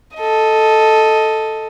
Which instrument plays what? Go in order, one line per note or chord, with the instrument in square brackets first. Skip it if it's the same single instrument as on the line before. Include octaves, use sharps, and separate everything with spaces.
[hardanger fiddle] A4 D#5